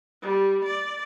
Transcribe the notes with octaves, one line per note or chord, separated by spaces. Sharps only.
G3
D5